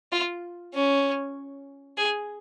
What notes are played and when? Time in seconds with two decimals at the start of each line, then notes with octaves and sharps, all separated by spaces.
0.12 F4
0.74 C#4
1.97 G#4